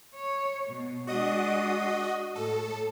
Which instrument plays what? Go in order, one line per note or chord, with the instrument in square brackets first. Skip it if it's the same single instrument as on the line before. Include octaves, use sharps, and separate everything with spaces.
[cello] C#5
B2
[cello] G#3 D4 [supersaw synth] F#4 D#5 D#6
[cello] A2 [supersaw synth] A4